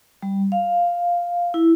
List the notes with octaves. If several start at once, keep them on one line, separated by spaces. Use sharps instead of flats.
G3
F5
E4